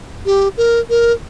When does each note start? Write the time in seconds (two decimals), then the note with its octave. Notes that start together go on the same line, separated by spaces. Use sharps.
0.26 G4
0.57 A#4
0.90 A#4